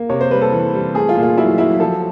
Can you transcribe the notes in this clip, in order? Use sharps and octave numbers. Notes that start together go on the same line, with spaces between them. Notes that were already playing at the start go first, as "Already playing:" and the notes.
Already playing: A#3
C3 C#5
C5
G3 B4
A4
E3
G3
A3 G#4
F4
A#2
F4
F#3 E4
F#3 E4
F3 A4